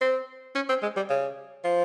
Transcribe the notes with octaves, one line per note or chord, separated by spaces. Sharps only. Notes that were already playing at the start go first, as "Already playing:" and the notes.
C4
C#4
C4
G#3
G3
C#3
F3